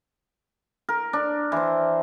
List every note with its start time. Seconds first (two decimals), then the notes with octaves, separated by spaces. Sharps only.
0.89 A#4
1.13 D4
1.52 E3 C5